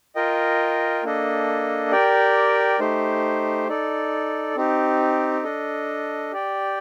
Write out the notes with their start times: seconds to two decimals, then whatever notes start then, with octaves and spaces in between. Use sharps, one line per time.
0.16 F4 A#4 D#5 G5
1.04 A#3 D4 A4 D#5
1.92 G4 A#4 D5 G5
2.79 A3 D#4 G4 C5
3.68 D#4 A4 D5
4.56 C4 D#4 G4
5.44 D4 A4 D#5
6.32 G4 D5 G5